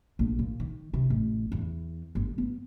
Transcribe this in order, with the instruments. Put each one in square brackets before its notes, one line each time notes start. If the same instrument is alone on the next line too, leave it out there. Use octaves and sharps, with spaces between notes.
[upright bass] A#1
A#2
D#3
C3
A1
E2
G1
B3